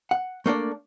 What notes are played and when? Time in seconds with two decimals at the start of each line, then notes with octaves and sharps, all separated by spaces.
0.11 F#5
0.46 A3 A#3 D4 D5